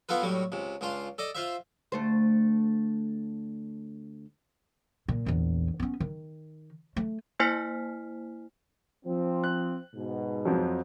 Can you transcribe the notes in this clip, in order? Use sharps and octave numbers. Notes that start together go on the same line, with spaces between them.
B3 E4 F4 A4 B4
A2 F#3 G3 A3
C#2 C3
C#2 D4 F4 C6
A4 D5 D#5
F4 C5 E5
D2 A3 C5
A#2
A#1 E2
B3 C#4
D#3
A3
A#3 E4 C5 G#5 F6 B6
F3 C4
F#6
G#2 B2
F2 F3 F#3